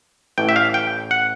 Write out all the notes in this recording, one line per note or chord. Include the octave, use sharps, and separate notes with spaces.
A1 A2 E3 G5
E5
F5
G5
F#5